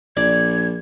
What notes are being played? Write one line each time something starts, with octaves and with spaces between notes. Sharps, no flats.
A#1 D5 G#6